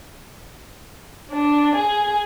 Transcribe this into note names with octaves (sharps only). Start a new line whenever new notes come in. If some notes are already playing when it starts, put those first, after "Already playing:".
D4
G#4